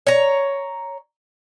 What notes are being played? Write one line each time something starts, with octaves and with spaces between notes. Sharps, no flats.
C#5 A#5